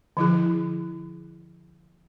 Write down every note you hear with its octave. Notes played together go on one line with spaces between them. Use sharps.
D3 F3 E4 G#4